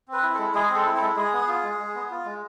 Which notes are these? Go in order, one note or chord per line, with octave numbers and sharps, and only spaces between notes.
C4 B4
E4
G#3 A4
G#3 G#4
C4 A4
E4
G#3 A4
G#3 G#4
B3
F4
G#3
G#3
B3
F4
G#3